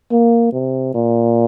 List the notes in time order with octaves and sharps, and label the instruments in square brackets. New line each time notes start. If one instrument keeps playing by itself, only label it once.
[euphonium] A#3
C3
A#2